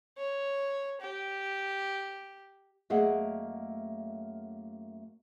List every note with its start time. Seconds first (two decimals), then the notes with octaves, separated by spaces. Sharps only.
0.18 C#5
1.01 G4
2.90 F#2 A3 A#3 G#4 D#5 F#5